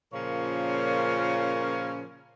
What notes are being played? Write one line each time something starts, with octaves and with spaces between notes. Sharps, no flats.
A#2 C#3 F3 C#4 A#4 C#5